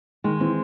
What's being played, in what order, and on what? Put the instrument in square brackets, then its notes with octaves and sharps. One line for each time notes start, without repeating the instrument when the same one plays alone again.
[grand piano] D#3 [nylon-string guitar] G#3
[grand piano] E3 [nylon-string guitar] C4